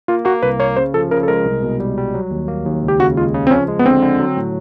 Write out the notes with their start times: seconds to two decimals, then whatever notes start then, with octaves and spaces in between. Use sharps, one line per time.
0.08 A#3 F4
0.25 A#3 F#4
0.42 C2 B4
0.60 A#3 C#5
0.76 C#3 C5
0.94 F3 A4
1.11 C#3 A#4
1.23 A4
1.28 G#3 A#4
1.46 C2
1.62 B2
1.80 G3
1.97 G3
2.14 F#3
2.31 D#2
2.48 A#3
2.66 D#2
2.83 C#2
2.88 G4
2.99 C#3 F#4
3.17 G#3 F4
3.34 C#3
3.47 C4
3.51 F3 C#4
3.68 G#3
3.79 B3
3.86 D3 C4
4.02 D3
4.20 F#3
4.37 A2